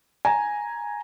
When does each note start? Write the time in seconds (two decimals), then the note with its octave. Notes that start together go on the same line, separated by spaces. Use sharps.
0.25 G#5 A#5